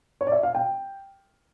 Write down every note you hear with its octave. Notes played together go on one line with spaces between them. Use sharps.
C#5
D5
E5
F5
G5